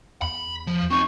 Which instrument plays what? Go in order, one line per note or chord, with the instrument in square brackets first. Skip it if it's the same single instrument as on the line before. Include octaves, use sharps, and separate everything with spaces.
[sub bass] E2 [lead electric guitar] B5
[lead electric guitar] F3
[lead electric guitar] C4 D#4 [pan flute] C#6